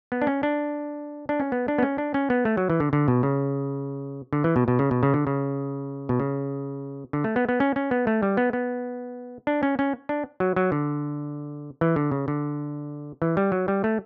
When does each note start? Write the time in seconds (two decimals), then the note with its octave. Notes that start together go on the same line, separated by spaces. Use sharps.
0.12 B3
0.22 D4
0.27 C#4
0.43 D4
1.29 D4
1.40 C#4
1.52 B3
1.68 D4
1.78 B3
1.83 C#4
1.98 D4
2.14 C#4
2.30 B3
2.45 A3
2.57 F#3
2.70 E3
2.80 D3
2.93 D3
3.08 B2
3.23 C#3
4.33 D3
4.44 E3
4.56 B2
4.68 B2
4.79 C#3
4.91 B2
5.03 C#3
5.14 D3
5.27 C#3
6.09 B2
6.20 C#3
7.13 D3
7.24 A3
7.36 B3
7.49 B3
7.60 C#4
7.76 C#4
7.91 B3
8.07 A3
8.22 G3
8.37 B3
8.53 B3
9.47 D4
9.63 C#4
9.79 C#4
10.09 D4
10.40 F#3
10.56 F#3
10.72 D3
11.81 E3
11.96 D3
12.11 C#3
12.28 D3
13.22 E3
13.37 G3
13.52 F#3
13.68 G3
13.84 A3